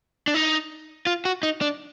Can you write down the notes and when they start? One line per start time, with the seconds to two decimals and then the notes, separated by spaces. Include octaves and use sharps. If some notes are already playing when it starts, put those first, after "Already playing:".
0.28 D4
0.34 D#4
1.07 F4
1.25 F#4
1.43 D#4
1.61 D4